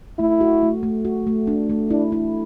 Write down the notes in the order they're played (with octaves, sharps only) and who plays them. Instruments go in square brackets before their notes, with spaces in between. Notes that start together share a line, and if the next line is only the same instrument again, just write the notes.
[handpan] A3 [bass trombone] E4
[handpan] F#4
A3
A3
F#4
A3
D4
A3
[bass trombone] D4 [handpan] E4
[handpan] E4